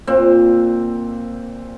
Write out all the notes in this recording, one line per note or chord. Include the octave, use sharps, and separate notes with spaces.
A#2 C4